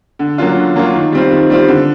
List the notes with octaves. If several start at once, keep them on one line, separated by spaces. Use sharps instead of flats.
D3
F#3 A#3 C#4 F4
D3
F#3 A#3 C#4 F4
D#3
G3 C4 F4
D#3
G3 C4 F4
D3